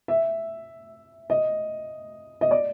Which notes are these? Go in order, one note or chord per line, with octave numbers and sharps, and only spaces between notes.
E5
D#5
D#5
D5